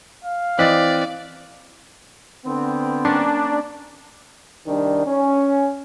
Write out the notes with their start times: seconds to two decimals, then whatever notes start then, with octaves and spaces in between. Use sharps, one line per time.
0.24 F5
0.59 E3 C4 D5 D#5 F#6 A6 B6
2.46 D3 B3 C4
3.05 A#3 C#4 D4
4.66 C2 D#3 G3 D4
5.06 C#4